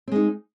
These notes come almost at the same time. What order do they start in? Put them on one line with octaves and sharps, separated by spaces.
C4 G#3 D#4